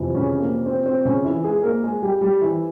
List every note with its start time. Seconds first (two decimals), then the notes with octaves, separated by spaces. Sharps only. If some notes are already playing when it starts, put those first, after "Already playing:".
Already playing: F2 C3 E3
0.14 C#3 C#4
0.40 A#3
0.66 C4
0.86 C4
1.05 C#3 C#4
1.24 E3 E4
1.44 G#3 G#4
1.63 A#3 A#4
1.83 G#3 G#4
2.02 G3 G4
2.21 G3 G4
2.41 E3 E4